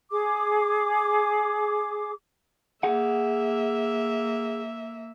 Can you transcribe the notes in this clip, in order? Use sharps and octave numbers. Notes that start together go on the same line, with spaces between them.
G#4 D6
A#3 G#4 E5 F#5